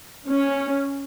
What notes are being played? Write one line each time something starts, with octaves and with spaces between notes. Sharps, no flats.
C#4